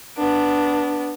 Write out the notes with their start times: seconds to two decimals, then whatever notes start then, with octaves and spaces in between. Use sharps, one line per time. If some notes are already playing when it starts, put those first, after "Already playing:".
0.18 B3 D4